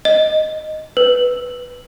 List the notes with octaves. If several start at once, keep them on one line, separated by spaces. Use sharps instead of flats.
D#5
B4